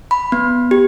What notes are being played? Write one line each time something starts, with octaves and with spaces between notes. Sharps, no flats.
B5
B3
G4